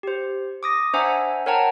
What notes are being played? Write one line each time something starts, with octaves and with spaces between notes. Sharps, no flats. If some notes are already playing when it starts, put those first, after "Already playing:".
G4 C5
D6 D#6 A#6
D4 C5 E5 F#5 G#5 A#5
A#4 C#5 F#5 G5 A5 A#5